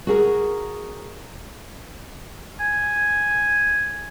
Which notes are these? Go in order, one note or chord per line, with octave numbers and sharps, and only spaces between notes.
F#4 G#4 A#4
G#5